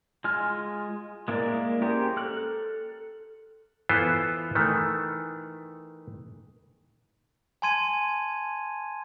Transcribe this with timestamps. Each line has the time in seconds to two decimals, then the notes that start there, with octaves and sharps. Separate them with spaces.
0.24 G#3 F4 G#5 F6
1.28 G#3 A#3 E4 A#4 D5
1.82 C#4 G4 G#4 A#4 C5
2.17 A4 F6 F#6
3.89 E3 B3 E4 F4 A4 C5
4.55 D#3 E3 A3
7.62 G#5 A5 C6 G#6 D#7